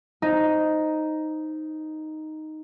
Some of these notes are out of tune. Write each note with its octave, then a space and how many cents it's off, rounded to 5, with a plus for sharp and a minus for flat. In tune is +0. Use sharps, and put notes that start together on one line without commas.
D#4 +0 C5 +0